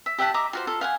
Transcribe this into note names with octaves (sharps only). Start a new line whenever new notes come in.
E5
G4 E5 F#5 A5
D#5 E5 A#5 D6
F4 F#4 C5
F4 A4
F5 F#5 G#5